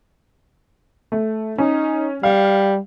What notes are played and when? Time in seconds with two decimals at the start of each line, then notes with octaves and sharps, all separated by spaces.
1.12 A3
1.58 C#4 D#4
2.23 G3 F5